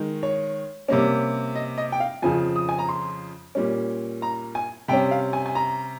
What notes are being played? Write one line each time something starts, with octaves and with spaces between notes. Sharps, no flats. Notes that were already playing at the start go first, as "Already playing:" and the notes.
Already playing: D#3 G#3
C#5
C3 G3 A#3 C#4
D#5
D#5
G5
F5
F2 C#3 F3 G#5
D#6
G#5
A#5
C6
A#2 G3 C#4
A#5
G#5
C3 G3 C#4 G5
F5
G#5
G#5
A#5